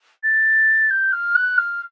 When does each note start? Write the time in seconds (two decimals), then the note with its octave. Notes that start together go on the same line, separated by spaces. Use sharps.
0.23 A6
0.90 G6
1.12 F6
1.35 F#6
1.57 F6